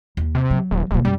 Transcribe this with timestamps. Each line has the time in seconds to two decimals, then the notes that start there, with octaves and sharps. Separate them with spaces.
0.17 D#2
0.35 C3
0.51 F#3
0.71 D#1
0.91 D#1 B2 A#3
1.05 F#2 G3